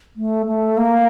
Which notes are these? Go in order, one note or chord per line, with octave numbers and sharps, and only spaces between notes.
A3
A3
A#3